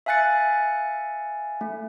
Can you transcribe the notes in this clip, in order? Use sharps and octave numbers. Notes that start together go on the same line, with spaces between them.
E5 F5 G#5 F#6 A6 C#7
A3